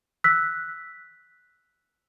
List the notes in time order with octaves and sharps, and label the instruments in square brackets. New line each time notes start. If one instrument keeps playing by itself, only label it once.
[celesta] E6 F#6 B6